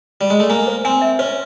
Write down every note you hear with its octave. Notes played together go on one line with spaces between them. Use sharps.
G3
G#3
A3
A#3 G#5
C5
C4 G#5
E5
C#4 C5